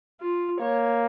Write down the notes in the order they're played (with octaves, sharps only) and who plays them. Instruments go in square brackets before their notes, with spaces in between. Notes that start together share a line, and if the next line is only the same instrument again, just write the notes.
[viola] F4
[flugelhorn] A#3 [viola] C#5